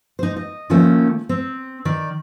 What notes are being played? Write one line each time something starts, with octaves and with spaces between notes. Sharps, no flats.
D#4 C5
D#5
D#3 F3 A3 A#3 C#4
C4
D#3 D5